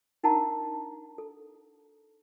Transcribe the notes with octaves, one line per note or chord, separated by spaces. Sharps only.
D4 D#4 A#4 F#5 A5 A#5
A4